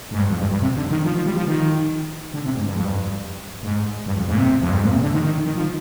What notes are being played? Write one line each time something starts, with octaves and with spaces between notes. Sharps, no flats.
G#2
G2
F2
G2
G2
C3
D3
D#3
F3
F3
G3
F3
D#3
D3
C3
G#2
G2
F2
G2
G#2
G2
F2
G#2
A#2
C3
F2
G2
G#2
A#2
C3
D3
D#3
D#3
D#3
F3